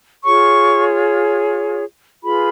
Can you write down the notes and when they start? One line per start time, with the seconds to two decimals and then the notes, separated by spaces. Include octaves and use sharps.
0.24 F4 G#4 C#5 C#6
2.23 F4 G#4 B4 B5